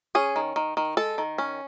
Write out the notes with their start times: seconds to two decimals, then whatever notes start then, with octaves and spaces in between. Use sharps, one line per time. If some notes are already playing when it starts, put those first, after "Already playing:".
0.15 C#4 G#4
0.36 D#3
0.56 D#3
0.77 D#3
0.97 G#3 A4
1.18 D#3
1.38 C#4